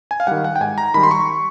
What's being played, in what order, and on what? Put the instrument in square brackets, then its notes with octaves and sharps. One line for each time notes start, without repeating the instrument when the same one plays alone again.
[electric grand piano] G#5
F5
D#3 G3 F#5
F#5
G5
G#2 G#5
A#5
D#3 G3 B5
C6
C#6